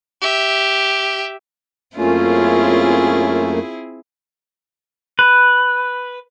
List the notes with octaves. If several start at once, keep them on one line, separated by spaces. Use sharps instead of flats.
G4 E5
F#2 A3 A#3 C4 C#4 E4 F4 G#4
B4